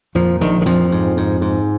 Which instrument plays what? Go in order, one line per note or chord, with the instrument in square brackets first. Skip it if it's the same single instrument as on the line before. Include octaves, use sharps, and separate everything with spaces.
[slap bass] F2 A#2 F3
A#1 D#3
D#3
F2 A#2 F3
G#2
G#2
G#2